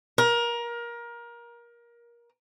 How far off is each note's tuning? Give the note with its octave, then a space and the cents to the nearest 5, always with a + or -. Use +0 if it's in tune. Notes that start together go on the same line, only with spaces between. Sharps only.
A#4 +25